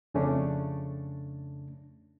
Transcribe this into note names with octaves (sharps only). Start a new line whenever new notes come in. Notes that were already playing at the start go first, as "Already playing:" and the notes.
F2 C#3 A3 C#4 D4